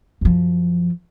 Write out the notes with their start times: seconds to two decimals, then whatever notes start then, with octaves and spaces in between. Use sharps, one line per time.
0.21 F#2 F3